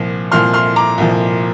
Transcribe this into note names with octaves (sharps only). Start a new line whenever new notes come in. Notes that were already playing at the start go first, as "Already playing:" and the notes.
Already playing: C2 A#2 F3
C2 A#2 F3 C6 F6
C6 F6
A#5 D6
C2 A#2 F3